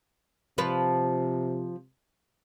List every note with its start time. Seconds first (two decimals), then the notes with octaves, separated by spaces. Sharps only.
0.58 C3 F3 B4